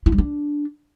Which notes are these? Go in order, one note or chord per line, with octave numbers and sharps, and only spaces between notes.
E4
G3
D4